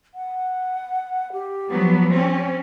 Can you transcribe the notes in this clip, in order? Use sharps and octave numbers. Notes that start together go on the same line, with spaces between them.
F#5
G4
F3 F#3 B3
C4 C#4